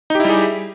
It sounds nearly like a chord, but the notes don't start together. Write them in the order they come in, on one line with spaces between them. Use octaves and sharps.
D#4 G4 E4 G3 G#4